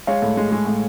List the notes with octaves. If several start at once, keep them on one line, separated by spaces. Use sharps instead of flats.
G#3 C#5 F5
A2
G#3
G#3
A2